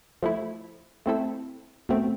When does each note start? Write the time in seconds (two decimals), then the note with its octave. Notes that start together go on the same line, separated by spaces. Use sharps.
0.23 F3 A3 E4
1.06 A3 C4 E4 A4 E5
1.89 B2 A3 C4